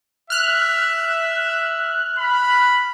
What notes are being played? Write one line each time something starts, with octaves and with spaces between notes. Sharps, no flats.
E5 F6 F#6
B5